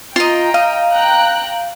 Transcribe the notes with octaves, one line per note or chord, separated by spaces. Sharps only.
F4 D#5 G5 A#5
D#5 F5
G5 A#5 F#6